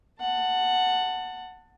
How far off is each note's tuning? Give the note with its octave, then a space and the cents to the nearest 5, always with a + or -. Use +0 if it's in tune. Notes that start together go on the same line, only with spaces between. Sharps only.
F#5 +0 A5 +20